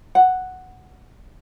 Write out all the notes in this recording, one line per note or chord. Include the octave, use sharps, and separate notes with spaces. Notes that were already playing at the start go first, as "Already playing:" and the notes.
F#5